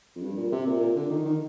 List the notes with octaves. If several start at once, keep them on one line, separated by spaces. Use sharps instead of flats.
F2
G2
A#2
C3
A#2
A#2
D3
D#3
D#3